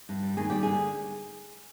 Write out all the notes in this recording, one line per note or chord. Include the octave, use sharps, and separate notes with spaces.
G2
G3
D#2 G#4
G3 G4
D3 G#4